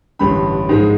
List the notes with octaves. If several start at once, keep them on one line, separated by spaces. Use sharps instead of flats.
A1 G2 D3 B5
G#2 F3 G#3